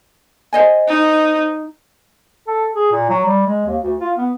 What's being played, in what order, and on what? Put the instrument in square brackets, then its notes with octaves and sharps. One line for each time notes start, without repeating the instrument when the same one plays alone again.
[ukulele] C5 D#5 G#5
[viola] D#4
[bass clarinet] A4
G#4
A#2
F#3
G3
G#3
D#2
D2
F4
B3